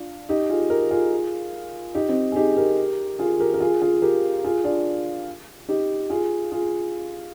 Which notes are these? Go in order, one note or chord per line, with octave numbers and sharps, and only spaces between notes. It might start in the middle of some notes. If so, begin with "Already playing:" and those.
Already playing: D4 F4
D#4 G4
F4 G#4
G4 A#4
F4 G#4
D#4 G4
C4 D#4
G#4
D#4 G4
G4 A#4
F4 G#4
G4 A#4
A#4
F4 G#4
F4 G#4
G4 A#4
F4 G#4
D4 F4
D#4 G4
F4 G#4
F4 G#4